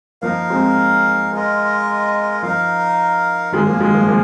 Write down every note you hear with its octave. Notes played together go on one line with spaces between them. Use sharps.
F3 A#3 D#4 A#4 F5
G#3 C4
G#3 F4 A#4 D#5
F3 D#4 A#4 F5
D#3 G#3 F4 G#4 F5
F3 A#3
D#3 G#3
F3 A#3
F3 A#3